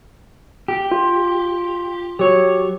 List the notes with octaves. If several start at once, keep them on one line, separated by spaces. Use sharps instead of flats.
G4
F4
F#3 G4 C#5